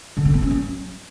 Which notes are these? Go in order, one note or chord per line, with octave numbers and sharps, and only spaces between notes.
D3
C4
B3
C#4
F#3